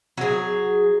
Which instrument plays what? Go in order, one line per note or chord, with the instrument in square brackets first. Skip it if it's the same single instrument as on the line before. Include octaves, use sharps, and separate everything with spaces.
[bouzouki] F#3 G#4